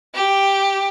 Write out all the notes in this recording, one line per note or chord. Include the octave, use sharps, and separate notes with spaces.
G4